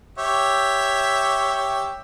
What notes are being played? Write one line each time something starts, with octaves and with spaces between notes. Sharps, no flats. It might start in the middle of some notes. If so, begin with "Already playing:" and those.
G4 C#5 E5